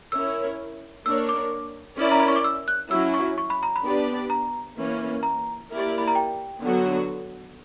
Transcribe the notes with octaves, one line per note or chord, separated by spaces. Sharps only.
C#4 E4 A#4 C#5 E6
A#3 D4 A#4 C#5 E6
D6
C#4 E4 A#4 D5
A#5
B5
C#6
D6
E6
F#6
F#3 C#4 E4 E6
C#6
C#6
B5
A#5
B5
B3 D4 G4 B4 D5
A#5
E3 A#3 C#4
A#5
A#3 E4 G4 A#4 D5
B5
A#5
G5
D3 F#3 B3 F#4